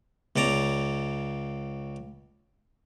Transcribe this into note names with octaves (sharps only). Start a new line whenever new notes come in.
C#2 C#3 D5 A#5